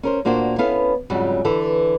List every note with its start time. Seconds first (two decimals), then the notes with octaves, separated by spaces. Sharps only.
0.03 C#4 A#4 C5
0.25 A#2 A#3 D4 F#4 C5
0.58 B3 C#4 E4 A4 F5
1.10 F2 G#2 C#3 F#3 G3
1.45 D3 E3 A4